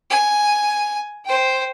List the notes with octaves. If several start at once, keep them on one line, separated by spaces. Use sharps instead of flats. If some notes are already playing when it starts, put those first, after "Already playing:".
G#5
C5 G5